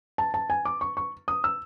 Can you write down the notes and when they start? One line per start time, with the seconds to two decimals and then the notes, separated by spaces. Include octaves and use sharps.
0.18 A5
0.34 A5
0.50 G#5
0.65 D6
0.81 C#6
0.97 C#6
1.28 D#6
1.44 E6